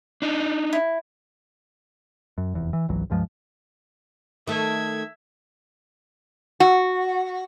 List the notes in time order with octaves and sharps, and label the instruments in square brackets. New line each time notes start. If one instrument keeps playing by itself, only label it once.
[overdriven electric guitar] D4 D#4
[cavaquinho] E4
[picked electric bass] F#2
F1 E2
E3
G#1 C#2 E3 F#3
C#2 G2 F3 G#3
[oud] D#3 A3 [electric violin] E5 G#6
[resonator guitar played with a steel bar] F#4